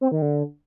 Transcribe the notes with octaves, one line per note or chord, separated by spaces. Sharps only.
C4
D#3
D3